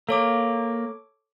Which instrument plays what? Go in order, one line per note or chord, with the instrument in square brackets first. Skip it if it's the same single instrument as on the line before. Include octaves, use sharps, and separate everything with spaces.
[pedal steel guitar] A#3 [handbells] A4 C#5 D6